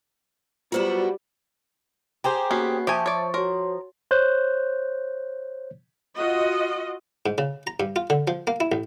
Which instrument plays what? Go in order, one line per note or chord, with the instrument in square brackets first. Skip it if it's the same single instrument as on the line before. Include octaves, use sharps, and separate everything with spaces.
[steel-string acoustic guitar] F#3 B3 F#4 [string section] G3 [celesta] F4 C5 E7
[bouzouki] G4 G#4 C5 [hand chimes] A#5
[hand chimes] A#3 F#4 C7 [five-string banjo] B3 C#4
[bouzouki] F3 [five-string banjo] G4 G#5 [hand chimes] E5 A5 C#6
[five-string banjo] C#5 D5 [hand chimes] C#6
[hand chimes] F#4 C#5 C6 [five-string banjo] A#4
[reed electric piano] C5 C#5 F#6 G6
[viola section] F4 F#4 D#5
[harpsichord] G#2
C#3
A#5
G2
F4
D3
F3
A#3
E4
A1